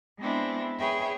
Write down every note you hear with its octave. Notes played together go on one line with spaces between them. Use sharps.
G#3 B3 C4 D4 E4
G#4 B4 C#5 E5 G5